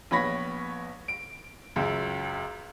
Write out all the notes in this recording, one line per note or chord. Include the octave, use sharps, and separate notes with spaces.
A#1 B3 C#5 B5 A#6 B6
D7
C#2 F#2